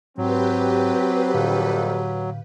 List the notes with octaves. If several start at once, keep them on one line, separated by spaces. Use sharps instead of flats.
G#2 F#3 C4 G4 B4
A#1 F2 A2 D3 A4 F5